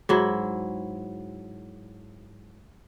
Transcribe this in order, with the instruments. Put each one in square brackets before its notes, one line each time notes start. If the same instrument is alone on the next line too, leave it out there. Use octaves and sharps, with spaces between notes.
[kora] G#2 F#3 E4